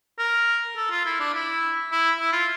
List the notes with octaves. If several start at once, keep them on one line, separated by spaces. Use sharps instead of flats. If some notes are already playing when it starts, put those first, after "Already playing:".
A#4
A4
F4
E4
D4
E4
E4
E4
F4